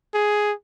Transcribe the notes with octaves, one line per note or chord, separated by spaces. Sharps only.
G#4